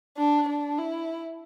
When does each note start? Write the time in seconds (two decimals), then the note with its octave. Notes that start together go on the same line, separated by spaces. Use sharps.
0.17 D4
0.48 D4
0.78 E4